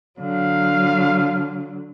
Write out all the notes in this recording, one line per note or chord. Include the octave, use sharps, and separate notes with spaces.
D3 F#3 F5